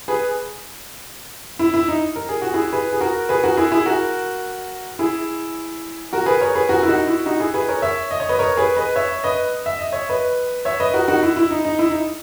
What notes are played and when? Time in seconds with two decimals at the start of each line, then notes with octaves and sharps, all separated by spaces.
0.08 G#4 B4
1.59 E4
1.74 E4
1.88 D#4
2.16 A#4
2.29 G#4
2.42 F#4
2.54 E4 G#4
2.73 G#4 B4
2.93 G#4
3.01 F#4 A#4
3.29 G#4 B4
3.44 F#4 A#4
3.57 E4 G#4
3.72 E4 G#4
3.86 F#4 A#4
4.99 E4 G#4
6.13 F#4 A#4
6.26 G#4 B4
6.41 A#4 C#5
6.55 G#4 B4
6.69 F#4 A#4
6.83 E4
6.88 D#4 F#4
7.07 E4
7.26 D#4 F#4
7.40 E4 G#4
7.54 G#4 B4
7.68 A#4 C#5
7.82 C#5 E5
8.11 D#5
8.20 C#5
8.29 B4 D#5
8.39 A#4 C#5
8.57 G#4 B4
8.77 B4 D#5
8.96 C#5 E5
9.24 B4 D#5
9.66 E5
9.79 D#5
9.92 C#5 E5
10.09 B4 D#5
10.65 C#5 E5
10.80 B4 D#5
10.94 F#4 A#4
11.08 D#4 F#4
11.23 E4
11.36 E4
11.51 D#4
11.65 D#4
11.79 E4
11.90 D#4